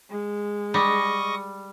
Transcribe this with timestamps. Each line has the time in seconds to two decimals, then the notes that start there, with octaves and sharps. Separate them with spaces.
0.10 G#3
0.74 G3 D#5 C#6 A#6